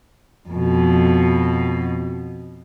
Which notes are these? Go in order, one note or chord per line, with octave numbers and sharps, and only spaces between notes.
F2 B2